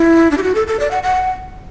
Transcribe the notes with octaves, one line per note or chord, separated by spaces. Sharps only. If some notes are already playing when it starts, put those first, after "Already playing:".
Already playing: E4
D4
G4
F#4
A4
A4
D5
F#5
F#5